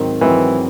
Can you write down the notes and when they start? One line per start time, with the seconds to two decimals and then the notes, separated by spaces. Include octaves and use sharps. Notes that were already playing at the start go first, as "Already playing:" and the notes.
Already playing: G#2 D#3 F#3 C4
0.21 G#2 D#3 E3 F#3 C4